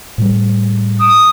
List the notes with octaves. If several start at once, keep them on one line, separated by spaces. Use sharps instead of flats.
A2 G3
D#6